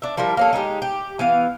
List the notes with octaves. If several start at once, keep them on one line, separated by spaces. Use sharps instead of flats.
D4 E5
F3 G3 E4 A#4
A#3 C#4 A4
G#3 D#4 E4 G4
G4
E3 B3 F5